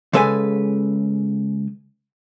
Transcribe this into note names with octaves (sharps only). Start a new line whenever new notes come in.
C#3 G#3 A4 B4 G#5